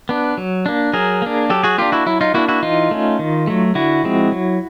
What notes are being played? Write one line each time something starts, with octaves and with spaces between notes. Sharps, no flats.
B3 D4
F#3
A#3 D4
F#3 G#4 A#4
A#3 D4
F#3 G4 A4
F#4 G#4
A#3 D4 F4 G4
E4 F#4
F#3 E4
D#4 F4
A#3 D4 E4 F#4
E4 F#4
E3 D#4 F4
A3 C#4
D#3
F#3 A3
D3 E4 F#4
F3 G#3 C4
F#3